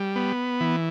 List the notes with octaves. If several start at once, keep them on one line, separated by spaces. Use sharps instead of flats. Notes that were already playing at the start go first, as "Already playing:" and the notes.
Already playing: G3
B3
E3